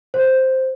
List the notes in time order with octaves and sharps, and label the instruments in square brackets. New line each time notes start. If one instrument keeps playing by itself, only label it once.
[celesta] C5